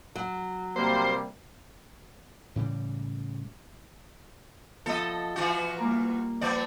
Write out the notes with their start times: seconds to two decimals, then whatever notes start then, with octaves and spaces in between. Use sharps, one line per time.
0.16 F#3
0.76 C3 G3 A#3 C5
2.56 A2 C#3 E3 G3
4.86 F3 B3 A4 D#5 E5
5.36 E3 F4 F#4
5.78 G3 A#3 A#4
6.41 F3 B3 D5